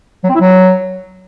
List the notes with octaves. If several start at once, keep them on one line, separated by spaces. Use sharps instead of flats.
F#3
C4
E4
F#3